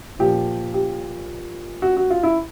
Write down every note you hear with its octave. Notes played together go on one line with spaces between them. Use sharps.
A#2 F3 G4
G4
F#4
F#4
F4
E4